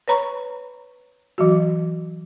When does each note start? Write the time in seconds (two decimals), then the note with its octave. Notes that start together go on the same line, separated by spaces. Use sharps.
0.08 B4 C#5 A#5 B5 C#6
1.38 E3 F#3 F#4